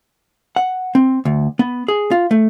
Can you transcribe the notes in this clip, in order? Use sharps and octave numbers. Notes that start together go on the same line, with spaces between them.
F#5
C4
D2
B3
G#4
F4
A3